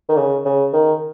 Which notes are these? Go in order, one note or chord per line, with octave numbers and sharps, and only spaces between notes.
D#3
C#3
C#3
D#3